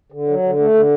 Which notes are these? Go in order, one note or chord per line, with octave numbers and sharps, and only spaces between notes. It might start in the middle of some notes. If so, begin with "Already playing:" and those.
D3
F#3
D3
A3
D3